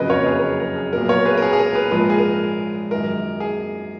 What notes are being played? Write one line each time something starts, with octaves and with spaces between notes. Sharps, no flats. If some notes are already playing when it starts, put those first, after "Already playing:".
Already playing: F#1 F2 C#3 F#3 A#3 B4 D#5
A#4 C#5
G#4 B4
A#4
G#4
A#4
G#4
B1 A#2 F#3 A#4
A#4 C#5
G#4 B4
A#4
G#4
G#4
A#4
G#4 B4
A#1 G#2 F3 G#3 B4
A#4
G#4
A#4
F#2 D#3 G#3 A#4
G#4